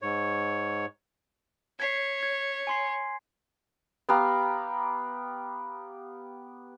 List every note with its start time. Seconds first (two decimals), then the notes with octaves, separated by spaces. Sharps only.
0.02 G#2 C#5
1.80 C#5 G#6 B6 C7
2.23 G#6
2.67 G#5 C6 C7
4.09 B3 G4 F5 A#5